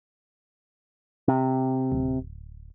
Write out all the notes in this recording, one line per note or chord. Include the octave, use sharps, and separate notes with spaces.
C3
D1